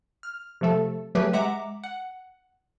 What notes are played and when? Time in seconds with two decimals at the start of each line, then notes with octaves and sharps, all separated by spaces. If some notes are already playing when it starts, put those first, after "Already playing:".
0.23 F6
0.61 C3 F3 A3 A4
1.15 F#3 A3 G4 G#4 B4
1.33 G#3 E5 F#5 A#5 D6
1.84 F#5